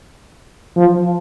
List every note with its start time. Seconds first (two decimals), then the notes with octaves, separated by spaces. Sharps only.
0.77 F3